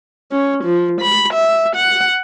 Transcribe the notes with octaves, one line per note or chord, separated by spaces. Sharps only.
C#4
F3
B5
E5
F#5